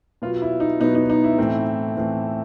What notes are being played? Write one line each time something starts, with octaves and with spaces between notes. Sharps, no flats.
B2 F#3 B3 F4
E4
D#4
B2 F#3 B3 D#4
D#4
D#4
E4
A2 E3 A3 C4
A2 E3 A3 C4